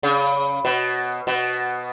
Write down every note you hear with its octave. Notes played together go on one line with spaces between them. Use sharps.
C#3
B2
B2